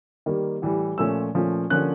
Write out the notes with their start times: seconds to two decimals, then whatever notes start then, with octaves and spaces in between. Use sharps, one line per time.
0.26 D#3 G3 A#3
0.62 A2 E3 G3
0.98 A#2 F3 A3 C#4 E6
1.35 A#2 F3 A3 C#4
1.70 D3 F3 A#3 C#4 F#6